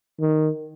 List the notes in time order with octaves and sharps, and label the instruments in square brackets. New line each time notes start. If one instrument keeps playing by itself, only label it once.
[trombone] D#3